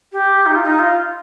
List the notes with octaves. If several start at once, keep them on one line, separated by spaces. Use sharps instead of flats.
G4
D#4
F4
D#4
F4